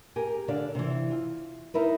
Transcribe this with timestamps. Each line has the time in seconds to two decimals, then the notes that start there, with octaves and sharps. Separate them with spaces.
0.16 G4 G#4 A#4 G#5
0.48 D3 D4 A4 F5
0.75 C3 E3
1.11 F4
1.74 D#4 E4 A#4 B4